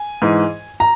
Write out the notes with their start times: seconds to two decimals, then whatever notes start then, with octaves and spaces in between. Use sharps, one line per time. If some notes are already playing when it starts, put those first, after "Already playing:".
Already playing: G#5
0.22 G#2 E3
0.80 A#5